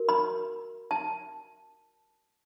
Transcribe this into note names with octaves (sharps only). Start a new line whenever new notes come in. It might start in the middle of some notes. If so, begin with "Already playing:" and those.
Already playing: F#4 A#4
B5
A5